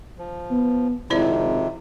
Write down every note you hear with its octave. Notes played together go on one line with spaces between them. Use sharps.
F3
B3
G#1 F2 C3 E4 C5 D5